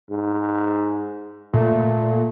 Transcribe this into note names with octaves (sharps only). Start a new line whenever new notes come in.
G#2
A#2 A3